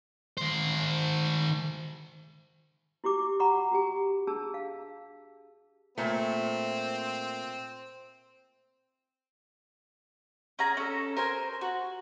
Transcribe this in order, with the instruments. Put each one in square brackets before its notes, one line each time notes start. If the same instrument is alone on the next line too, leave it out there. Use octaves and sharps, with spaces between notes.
[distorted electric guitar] D#3 C5
[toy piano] E4 F#4 G4 D6
F#5 A#5 B5 C#6 D6
F#4 G4 G#5
D4 G#4 A5 E6
F5
[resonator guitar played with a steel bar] A#2 A3 [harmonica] C4
[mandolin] C#4 G#4 A#5
C#4 A4
A#4 C5 G#5
F#4